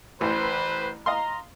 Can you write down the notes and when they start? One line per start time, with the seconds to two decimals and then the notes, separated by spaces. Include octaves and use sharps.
0.21 A1 E3 B4 C5
1.06 D#5 F5 A#5 C6